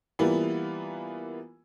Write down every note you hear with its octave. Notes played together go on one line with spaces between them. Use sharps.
E3 G3 A#3 B3 E4 F4